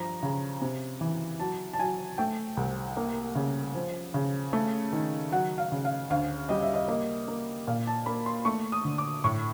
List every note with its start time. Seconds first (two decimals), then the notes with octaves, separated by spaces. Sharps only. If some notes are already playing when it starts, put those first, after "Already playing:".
Already playing: G2 F3 A#5
0.23 C#3
0.62 C3
1.01 E3
1.40 F#3 A5
1.73 A5
1.79 F#3 G#5
2.18 A3 G5
2.57 C2
2.97 A#3
3.35 C#3
3.75 F3
4.14 C#3
4.53 A3
4.93 D#3
5.31 F#3 F#5
5.58 F5
5.72 C#3
5.85 F5
6.10 D2 F5
6.49 G3 D#5
6.63 E5
6.74 D#5
6.88 A#3 D#5
7.28 A#3
7.67 A#2 F5
7.87 A5
8.06 A#3 B5
8.26 C6
8.45 A3 C#6
8.72 D#6
8.85 D3
8.98 D6
9.24 A2 C#6